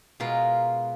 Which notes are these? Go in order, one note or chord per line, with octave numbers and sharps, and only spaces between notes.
B2 G#3 F4 A#4